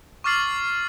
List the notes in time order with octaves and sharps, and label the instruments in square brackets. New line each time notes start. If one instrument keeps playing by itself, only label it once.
[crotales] C#6 D6 F6 A6 C7 F#7